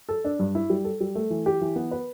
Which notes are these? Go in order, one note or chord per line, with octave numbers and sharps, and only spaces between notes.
A4
D4
G2
E4
G3
A4
G3
A3
E3
G4
E3
B3
B4